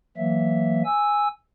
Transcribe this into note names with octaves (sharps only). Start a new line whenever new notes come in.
E3 F#3 A#3 E5
G#5 E6